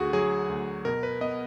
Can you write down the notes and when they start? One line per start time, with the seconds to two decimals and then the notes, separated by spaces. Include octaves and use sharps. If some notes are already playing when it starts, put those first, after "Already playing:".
Already playing: D2 D3 F#4 G#4
0.13 F#3 G#4
0.49 D2
0.85 B2 A#4
1.03 B4
1.21 B3 D#5